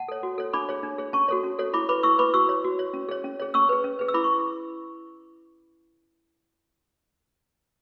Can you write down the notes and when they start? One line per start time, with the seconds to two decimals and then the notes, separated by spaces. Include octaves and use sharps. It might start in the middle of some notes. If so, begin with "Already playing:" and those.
Already playing: F#5 A5
0.08 A4 C#5
0.23 F#4
0.38 A4 C#5
0.53 D4 B5 D6
0.69 G#4 C#5
0.83 D4
0.98 G#4 C#5
1.13 C#4 A5 C#6
1.28 F#4 A4 C#5
1.43 C#4
1.59 F#4 A4 C#5
1.73 E4 B5 D6
1.89 B4 B5 D6
2.03 E4 C#6 E6
2.19 B4 B5 D6
2.34 F#4 C#6 E6
2.49 C#5
2.64 F#4
2.79 C#5
2.94 C#4
3.08 G#4 C#5
3.24 C#4
3.40 G#4 C#5
3.54 C#4 C#6 E6
3.69 G#4 B4
3.84 C#4
3.99 G#4 B4
4.08 E6
4.14 E4 B5 D6
4.24 C#6